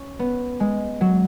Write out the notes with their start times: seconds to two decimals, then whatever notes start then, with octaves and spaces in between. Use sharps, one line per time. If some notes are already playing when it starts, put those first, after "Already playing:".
Already playing: C#4
0.19 B3
0.60 G#3
1.01 F#3